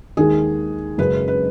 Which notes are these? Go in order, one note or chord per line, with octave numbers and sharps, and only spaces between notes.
D#2 D#3 G#3 G#4
F#1 F#2 C#3 G#3 B4
B4